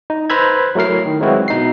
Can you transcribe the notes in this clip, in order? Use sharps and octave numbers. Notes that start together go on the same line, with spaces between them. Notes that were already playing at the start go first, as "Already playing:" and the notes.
D#4
B4 C5 A#5 B5 E6 G#6
F#3 A3 E4 A#4 C7
D#3
F#3 G#3 C4 E4 F#4 B4
B2 D#4 C7